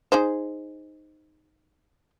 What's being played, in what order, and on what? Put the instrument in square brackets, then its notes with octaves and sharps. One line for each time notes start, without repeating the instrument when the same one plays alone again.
[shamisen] D#4 G#4 C5